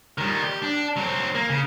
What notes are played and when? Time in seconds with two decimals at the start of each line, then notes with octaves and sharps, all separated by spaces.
0.18 D#3 G3
0.44 G4
0.62 D4
0.96 F#3 C4
1.35 A#3
1.49 C#3